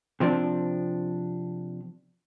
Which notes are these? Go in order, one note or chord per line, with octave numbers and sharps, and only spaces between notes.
C3 F3 C4 D4